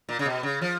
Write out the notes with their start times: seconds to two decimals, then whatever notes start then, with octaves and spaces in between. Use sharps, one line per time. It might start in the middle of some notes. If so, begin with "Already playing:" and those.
0.09 A#2
0.19 C#3
0.26 B2
0.43 C#3
0.61 F3